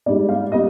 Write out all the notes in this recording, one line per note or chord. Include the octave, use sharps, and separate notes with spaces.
G#2 G3 B3 D5
F5
G3 B3 D#5